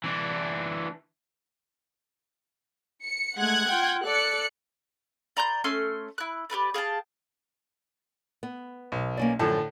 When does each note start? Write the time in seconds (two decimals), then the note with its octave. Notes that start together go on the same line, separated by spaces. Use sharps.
0.04 E3 D4
3.04 C#7
3.37 G#3 A3 F#5 F#6 G#6
3.68 F4 G5
4.04 A4 D5 F#6 C#7
5.37 D5 A#5 C6 G6
5.64 A3 C#4 C6
6.18 E4 F#6
6.50 G4 A#4 B4 D5
6.74 G#4 F5 G5 A5
8.43 B3
8.92 B1
9.17 A#3 C#4 D5
9.39 F#2 A2 D3 F3 A5